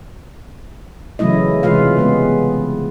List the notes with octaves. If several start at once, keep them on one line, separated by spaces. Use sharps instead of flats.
C#3 E3 F#3 A3 E4 D#5
C3 E3 G#3 F4 B4 F5
C#3 G#3 B3